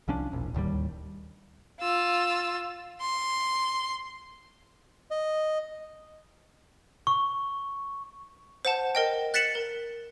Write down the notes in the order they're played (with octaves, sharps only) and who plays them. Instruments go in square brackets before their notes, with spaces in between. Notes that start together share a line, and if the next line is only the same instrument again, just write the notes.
[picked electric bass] C2 F3 C#4 D4
E1 A#1
D1 D#2 D3 G3
[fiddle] F4 E6
C6
[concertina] D#5
[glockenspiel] C#6
[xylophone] C5 F#5 A5
A#4 D#5 G5
F#6 A6 B6 C#7 E7 F#7
A#4